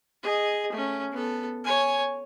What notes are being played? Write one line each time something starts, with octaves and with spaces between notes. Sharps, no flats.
G#4 D#5
A3 C#4
B3 A4
C#5 G#5